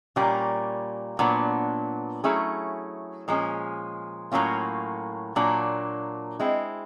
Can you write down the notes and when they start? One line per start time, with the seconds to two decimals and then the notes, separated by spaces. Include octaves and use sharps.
0.16 A#2 G3 A#3 C#4
1.19 A#2 F#3 B3 D4
2.24 F#3 A3 C#4 E4 G#4
3.28 A#2 F3 G#3 C#4
4.32 A2 F#3 A#3 C#4 F4
5.36 A#2 F#3 A#3 D4
6.40 G#3 C4 E4